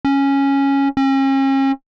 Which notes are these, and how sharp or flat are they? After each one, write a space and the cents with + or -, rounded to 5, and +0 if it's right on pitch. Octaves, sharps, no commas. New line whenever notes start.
C#4 -5
C#4 -40